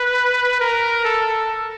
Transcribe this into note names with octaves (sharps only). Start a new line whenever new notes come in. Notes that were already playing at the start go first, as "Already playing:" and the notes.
Already playing: B4
A#4
A4